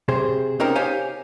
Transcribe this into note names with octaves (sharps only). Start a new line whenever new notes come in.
C3 G#4 C5
C4 C#4 D#4 G4 A#4 C5
G4 C5 C#5 F5 G#5